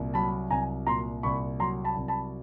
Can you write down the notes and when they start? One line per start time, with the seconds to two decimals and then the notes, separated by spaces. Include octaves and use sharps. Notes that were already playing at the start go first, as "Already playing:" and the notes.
Already playing: C2 A#2
0.14 F#3 A5 B5
0.50 C2 G#5 A#5
0.87 A#2 A#5 C6
1.23 C2 B5 C#6
1.59 F#3 A#5 C6
1.84 A5 B5
1.97 C2
2.08 A5 B5